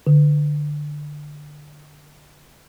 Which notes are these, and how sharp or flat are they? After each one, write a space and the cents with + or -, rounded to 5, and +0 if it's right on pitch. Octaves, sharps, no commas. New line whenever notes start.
D3 +10